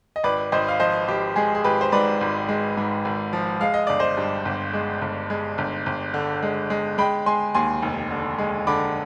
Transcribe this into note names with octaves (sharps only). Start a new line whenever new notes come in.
D#5
G#1 B4 D5
G#1 C5 D#5
F5
F3 C5 D#5
G#1 G4
G#3 G#4
G#4
G#1 G4 B4
C5
G#2 B4 D5
G#1
G#3
G#2
G#1
F3
G#3 F5
D#5
G1 D5
C5 D#5
G2
G1
G#3
G1
G#3
G1
G1
D3
G#3
G#3
G#3 G5 B5
G#3 G#5 C6
D#2 G#5 C6
F1
D3
G#3
D3 B5 D6